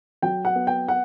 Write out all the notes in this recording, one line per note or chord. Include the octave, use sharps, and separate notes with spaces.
F#3 G5
F#5
B3
G5
F#5